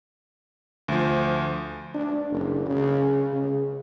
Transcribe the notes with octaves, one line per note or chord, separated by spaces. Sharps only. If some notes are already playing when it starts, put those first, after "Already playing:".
D2 F3
D4
F#1
C#3
C#3